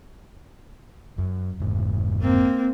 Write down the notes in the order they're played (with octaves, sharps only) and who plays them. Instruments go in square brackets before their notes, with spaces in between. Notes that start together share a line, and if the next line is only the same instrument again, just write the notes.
[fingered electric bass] F#2
F1 G#2
[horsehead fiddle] A#3 C4